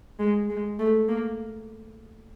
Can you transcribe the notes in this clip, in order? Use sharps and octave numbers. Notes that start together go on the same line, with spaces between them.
G#3
G#3
A3
A#3